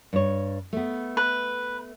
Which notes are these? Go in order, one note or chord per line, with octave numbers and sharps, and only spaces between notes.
G2 C#5
A3 B3
B4